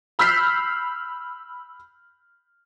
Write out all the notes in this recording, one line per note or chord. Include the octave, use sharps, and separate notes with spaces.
B5 E6 F6 G6 B6 C7